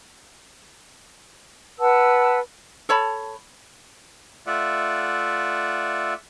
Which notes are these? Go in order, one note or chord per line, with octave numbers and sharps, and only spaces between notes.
B4 F#5 A5 E6
A4 C#5 A5 B5
A3 F4 D5 E5 F#5